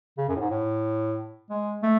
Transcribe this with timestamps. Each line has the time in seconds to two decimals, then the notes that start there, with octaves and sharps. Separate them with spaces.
0.17 C#3
0.28 F#2
0.36 A2
0.40 G#2
0.50 A2
1.50 G#3
1.83 A3